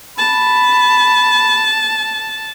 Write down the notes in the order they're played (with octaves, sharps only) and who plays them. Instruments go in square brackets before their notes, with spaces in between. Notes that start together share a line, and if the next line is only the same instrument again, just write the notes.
[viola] A5 [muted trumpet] B5